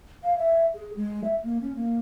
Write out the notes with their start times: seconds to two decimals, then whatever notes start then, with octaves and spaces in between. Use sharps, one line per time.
0.23 F5
0.38 E5
0.74 G#4
0.96 G#3
1.24 E5
1.43 A#3
1.61 C#4
1.75 A#3